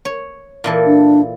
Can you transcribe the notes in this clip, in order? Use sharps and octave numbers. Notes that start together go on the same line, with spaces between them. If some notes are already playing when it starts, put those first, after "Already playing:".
C#5
A#2 E3 A4
D4